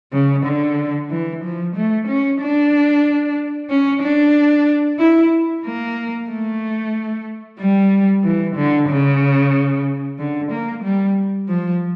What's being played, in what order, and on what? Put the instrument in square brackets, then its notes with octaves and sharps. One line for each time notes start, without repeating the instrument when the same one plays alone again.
[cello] C#3
D3
E3
F3
A3
C#4
D4
C#4
D4
E4
A#3
A3
G3
E3
D3
C#3
D3
A#3
G3
F3